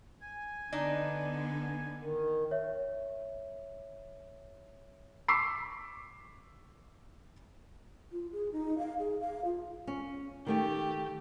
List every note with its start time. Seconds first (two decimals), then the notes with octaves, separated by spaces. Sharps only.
0.21 G#5
0.72 D3 B3 D4 D#4
2.01 D#3
2.51 C#5 E5
5.28 C#6 D6 E6 B6 C7
8.12 F4
8.32 G#4
8.53 D#4
8.78 F5
8.99 G#4
9.21 F5
9.45 F4
9.87 C#4
10.46 D#3 A3 G4 G5